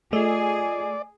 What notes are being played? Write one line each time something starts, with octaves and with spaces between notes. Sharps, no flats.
A3 F4 G#4 D5 D#5